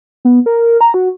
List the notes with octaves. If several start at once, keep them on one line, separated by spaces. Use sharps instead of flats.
B3
A#4
A#5
F#4